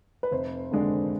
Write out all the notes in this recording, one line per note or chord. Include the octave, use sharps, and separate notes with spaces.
B4
F1 C5
D#2 D3 G#3 D4